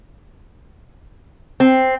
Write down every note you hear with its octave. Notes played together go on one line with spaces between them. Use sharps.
C4